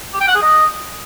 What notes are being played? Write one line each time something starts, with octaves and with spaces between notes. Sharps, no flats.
G4
G5
F#5
G#4
D#5